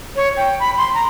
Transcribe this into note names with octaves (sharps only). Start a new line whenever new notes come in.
C#5
G5
B5
C6
A#5